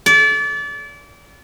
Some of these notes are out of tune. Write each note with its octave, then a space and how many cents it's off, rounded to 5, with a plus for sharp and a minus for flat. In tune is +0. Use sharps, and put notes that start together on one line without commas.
D5 -30